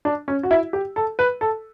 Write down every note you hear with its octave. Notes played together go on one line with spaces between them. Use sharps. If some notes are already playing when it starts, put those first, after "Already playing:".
D4
C#4
F#4
E4
G4
A4
B4
A4